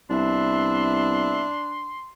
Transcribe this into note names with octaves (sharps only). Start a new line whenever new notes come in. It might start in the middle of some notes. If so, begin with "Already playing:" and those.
C2 B3 D4 E5 C6